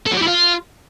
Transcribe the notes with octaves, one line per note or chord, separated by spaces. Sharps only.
A4
F#3
G4
E4
F4